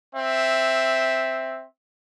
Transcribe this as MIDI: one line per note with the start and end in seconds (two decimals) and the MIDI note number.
0.14 1.64 60
0.14 1.64 76